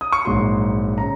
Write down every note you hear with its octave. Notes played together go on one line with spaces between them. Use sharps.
D#6
C#6
A#1 G#2 F#3 C6
C#3 A#5